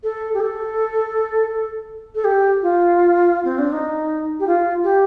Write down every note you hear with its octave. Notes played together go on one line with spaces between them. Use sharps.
A4
G4
A4
A4
G4
F4
C4
D4
D#4
G4
F4
G4